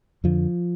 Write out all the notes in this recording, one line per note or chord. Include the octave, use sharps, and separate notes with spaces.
F2 D3 F3